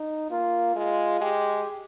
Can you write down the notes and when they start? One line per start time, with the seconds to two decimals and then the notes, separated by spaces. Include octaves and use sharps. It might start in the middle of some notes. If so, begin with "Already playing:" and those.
Already playing: D#4
0.30 A#3 F4
0.76 G#3 F4
1.21 G#3 G4